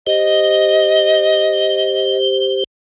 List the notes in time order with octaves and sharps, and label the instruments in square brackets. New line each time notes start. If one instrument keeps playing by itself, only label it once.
[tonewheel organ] G4 C5 [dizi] D#5